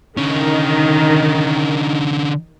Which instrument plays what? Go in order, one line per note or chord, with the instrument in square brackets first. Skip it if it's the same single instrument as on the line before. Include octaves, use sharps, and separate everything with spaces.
[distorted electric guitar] D3 C#4 [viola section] D#3